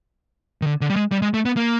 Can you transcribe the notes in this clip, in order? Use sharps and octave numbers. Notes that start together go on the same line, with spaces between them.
D#3
D3
D3
G3
G#3
G3
G#3
A3
B3
A#3